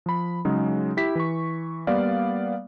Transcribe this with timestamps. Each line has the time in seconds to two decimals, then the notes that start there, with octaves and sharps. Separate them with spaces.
0.06 F3 B5
0.45 C#3 F#3 G#3 D#4
0.97 E4 G4 B6
1.15 E3 C#6
1.87 G3 A#3 B3 D5 F5